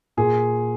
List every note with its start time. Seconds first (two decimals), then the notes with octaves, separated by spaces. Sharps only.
0.17 A#2 G#4